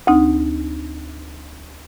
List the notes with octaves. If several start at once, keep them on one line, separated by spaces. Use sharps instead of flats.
D2 C4 D#4